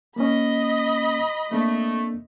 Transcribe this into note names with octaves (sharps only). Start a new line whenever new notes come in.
A#3 C#4 D#5 B5
A3 A#3 C4 D4